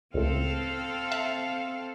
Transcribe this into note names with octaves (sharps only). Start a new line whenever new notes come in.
C#2 A2 C4 A4 F5
E5 A5 F#6